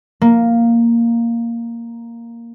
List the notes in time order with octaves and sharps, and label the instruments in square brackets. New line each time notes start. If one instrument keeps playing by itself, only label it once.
[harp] A#3